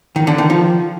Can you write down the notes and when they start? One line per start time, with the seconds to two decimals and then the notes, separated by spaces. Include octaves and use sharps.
0.16 D#3
0.27 D3
0.38 D#3
0.50 F3